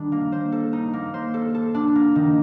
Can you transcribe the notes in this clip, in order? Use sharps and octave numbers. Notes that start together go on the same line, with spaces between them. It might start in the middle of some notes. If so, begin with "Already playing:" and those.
Already playing: D#3 G3 D4
A#3
C5
A4
D#4
A#3
C5
A4
A4
D4
A#3
D#3